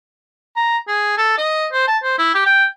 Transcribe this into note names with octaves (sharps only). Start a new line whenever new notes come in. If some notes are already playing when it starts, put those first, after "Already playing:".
A#5
G#4
A4
D#5
C5
A5
C5
E4
G4
G5